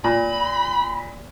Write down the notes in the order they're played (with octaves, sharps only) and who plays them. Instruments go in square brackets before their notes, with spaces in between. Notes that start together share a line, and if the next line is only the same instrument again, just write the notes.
[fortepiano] A#2 [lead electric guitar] B5